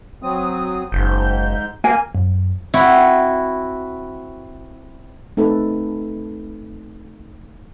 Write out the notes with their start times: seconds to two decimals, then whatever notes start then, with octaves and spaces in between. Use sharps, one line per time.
0.23 F#3 C4 D#6
0.92 F#1 G#2 G6
1.84 A#3 G#5
2.15 F#2
2.74 C4 E4 F#4
5.37 A3 C4 D#4 A4 B4